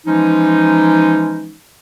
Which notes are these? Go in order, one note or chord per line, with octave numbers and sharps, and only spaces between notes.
E3 F3 G#3 C#4 D#4